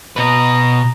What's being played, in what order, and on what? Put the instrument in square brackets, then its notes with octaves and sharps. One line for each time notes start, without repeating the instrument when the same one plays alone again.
[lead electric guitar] B2 B4 [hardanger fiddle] D#5 A#5